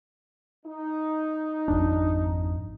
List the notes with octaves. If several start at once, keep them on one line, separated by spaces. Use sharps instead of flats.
D#4
G#1 F2 D4